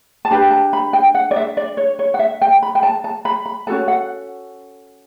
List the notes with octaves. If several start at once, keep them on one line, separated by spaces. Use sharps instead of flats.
A5
D4 G4 B4 B5
A5
B5
G5
F#5
D5
E5
D5
C#5
C#5
F#5
E5
G5
B5
G5
A5
A5
B5
B5
C#4 F#4 A4 A5
F#5